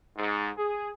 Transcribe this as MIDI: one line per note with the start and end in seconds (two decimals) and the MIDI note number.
0.17 0.48 44
0.58 0.89 68